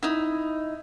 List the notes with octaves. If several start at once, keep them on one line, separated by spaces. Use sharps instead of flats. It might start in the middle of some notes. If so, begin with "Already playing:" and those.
D#4 E4